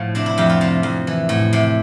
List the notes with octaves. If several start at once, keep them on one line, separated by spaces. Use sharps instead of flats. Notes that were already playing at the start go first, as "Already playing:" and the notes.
Already playing: A2 F3
C3 D4
E4
F2 G4
F4
C3
F2
E3
A2
C3